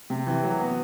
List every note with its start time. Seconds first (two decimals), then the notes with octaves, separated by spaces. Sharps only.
0.10 C3
0.27 E3
0.44 F#3
0.60 B3